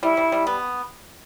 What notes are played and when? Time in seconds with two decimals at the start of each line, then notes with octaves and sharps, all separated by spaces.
0.03 G3 E4
0.17 G3
0.32 G3
0.47 B3